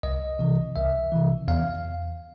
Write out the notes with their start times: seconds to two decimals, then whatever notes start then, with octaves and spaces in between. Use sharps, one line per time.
0.03 C2 D#5
0.39 C3 E3
0.76 C2 E5
1.12 C3 E3
1.48 E2 F5